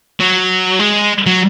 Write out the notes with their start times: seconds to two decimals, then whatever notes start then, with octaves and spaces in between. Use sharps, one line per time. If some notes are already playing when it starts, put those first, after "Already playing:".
0.20 F#3
0.80 G#3
1.27 F#3